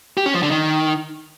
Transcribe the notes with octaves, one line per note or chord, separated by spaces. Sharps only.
G4
C#4
F3
D3
D#3